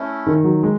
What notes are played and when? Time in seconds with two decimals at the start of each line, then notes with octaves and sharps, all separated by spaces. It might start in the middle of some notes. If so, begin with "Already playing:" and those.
Already playing: A3 C#4 E4
0.27 D#3
0.44 F#3
0.63 G#3